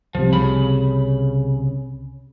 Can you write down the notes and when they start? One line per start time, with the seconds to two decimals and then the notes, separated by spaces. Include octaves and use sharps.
0.15 C2 C3 F3
0.33 C#3 B5